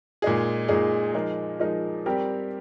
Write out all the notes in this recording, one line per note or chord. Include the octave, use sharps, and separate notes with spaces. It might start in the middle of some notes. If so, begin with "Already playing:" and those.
A#2 G#3 D#4 G#4
A#2 G#3 D#4 G#4
F3 G#3 D#4 A#4
F3 G#3 D#4 A#4
G3 C4 G4 A#4